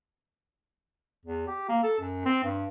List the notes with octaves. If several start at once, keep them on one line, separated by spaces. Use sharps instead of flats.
E2
G4
A#3
A4
F#2
C4
G2